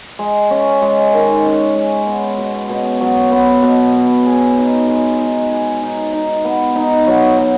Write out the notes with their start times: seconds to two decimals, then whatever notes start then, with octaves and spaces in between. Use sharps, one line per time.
0.19 G#3
0.51 C#4
0.82 G#3
1.13 D#3
1.45 C#4
1.75 G#3
2.07 B3
2.38 B2
2.69 B2
3.01 F#3
3.32 B3
3.63 B2
3.94 B4
4.26 G#4
4.57 D#4
4.88 G#3
5.19 D#4
5.51 G#4
5.82 D#4
6.13 D#4
6.45 B3
6.76 D#4
7.07 F#3
7.38 F#3